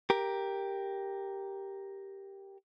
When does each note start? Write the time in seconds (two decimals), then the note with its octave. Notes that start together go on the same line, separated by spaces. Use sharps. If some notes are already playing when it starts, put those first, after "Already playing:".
0.10 G4 A#4